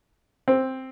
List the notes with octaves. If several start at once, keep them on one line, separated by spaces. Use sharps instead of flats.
C4